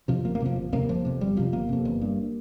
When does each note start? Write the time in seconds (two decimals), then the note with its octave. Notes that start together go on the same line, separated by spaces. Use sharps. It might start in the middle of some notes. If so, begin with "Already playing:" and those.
0.08 F2 C3 F3
0.25 G1 A#3
0.35 A#3
0.40 F2 C3 F3
0.56 G1
0.73 F2 C3 A#3
0.89 G1 F3
1.05 F2 C3
1.21 G1 G3
1.37 F2 C3 F3
1.52 G1 A#3
1.69 F2 C3
1.85 G1
2.01 G2